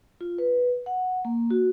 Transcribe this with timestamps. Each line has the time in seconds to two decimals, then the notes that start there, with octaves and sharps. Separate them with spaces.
0.21 F4
0.38 B4
0.86 F#5
1.25 A#3
1.50 F#4